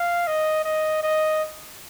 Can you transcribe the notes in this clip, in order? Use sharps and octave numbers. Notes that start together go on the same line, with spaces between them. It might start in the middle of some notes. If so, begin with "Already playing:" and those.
Already playing: F5
D#5
D#5
D#5